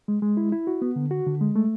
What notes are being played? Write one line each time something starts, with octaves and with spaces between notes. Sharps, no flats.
G#3
G#3
E4
E4
F#4
B3
D3
F#4
D3
G#3
A3